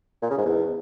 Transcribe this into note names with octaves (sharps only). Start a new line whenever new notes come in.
A#2
C#3
G#2
E2